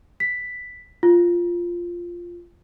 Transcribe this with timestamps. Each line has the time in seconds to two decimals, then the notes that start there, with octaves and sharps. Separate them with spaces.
0.20 B6
1.03 F4